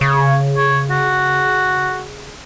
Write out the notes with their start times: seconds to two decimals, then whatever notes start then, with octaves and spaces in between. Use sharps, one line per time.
0.01 C#3 C#5
0.57 C#5
0.91 F#4